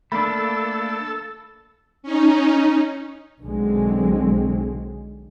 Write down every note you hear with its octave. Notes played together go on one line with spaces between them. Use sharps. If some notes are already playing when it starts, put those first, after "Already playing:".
A3 A#3 D4 A4 B5
C#4 D#4
B1 D3 F#3 G#3 C4